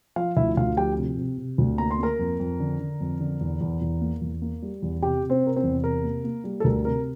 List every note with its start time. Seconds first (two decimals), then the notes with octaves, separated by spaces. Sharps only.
0.16 F3 F4 F5
0.36 D2 E4 E5
0.57 D2 F4 F5
0.77 F3 G4 G5
0.97 C3
1.17 C3
1.38 C3
1.58 D2
1.78 A#3 A#5
1.91 C6
1.99 A#3 A#4 A#5
2.19 F2
2.39 F2
2.60 D3
2.80 D3
3.00 F2
3.20 D3
3.41 E2
3.61 E2
3.81 E2
4.01 A#3
4.21 E2
4.42 A#3
4.62 G3
4.82 E2
5.02 C3 G4 G5
5.23 C3
5.30 C4 C5
5.43 C3 A#4
5.56 C4 C5
5.63 E2
5.83 C3 A#4
6.04 A#3
6.24 A#3
6.44 G3
6.60 A4
6.64 D2 A#4
6.85 C3 A#4